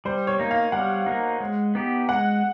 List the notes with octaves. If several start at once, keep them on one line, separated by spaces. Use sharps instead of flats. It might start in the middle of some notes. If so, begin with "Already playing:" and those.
G3 C5
C#5
A#3 D#4
F5
G3 F#5
A#3 D#4
G#3
B3 D#4 G4
G#3 F#5